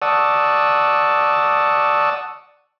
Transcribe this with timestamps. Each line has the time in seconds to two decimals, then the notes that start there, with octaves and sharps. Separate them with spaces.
0.02 D5 F#5 A5 C#6 D#6 E6